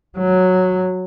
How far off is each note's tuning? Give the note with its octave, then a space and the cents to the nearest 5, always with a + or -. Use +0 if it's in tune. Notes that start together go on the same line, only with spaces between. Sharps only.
F#3 -5